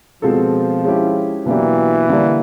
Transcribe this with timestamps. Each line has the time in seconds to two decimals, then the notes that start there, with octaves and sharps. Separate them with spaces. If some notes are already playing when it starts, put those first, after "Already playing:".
0.22 B2 F3 G#3 C4 F4 A4
0.84 G#3 C#4 E4 G4
1.46 B2 E3 F#3 A#3 D4 G4
2.09 D3 G3 A#3 D4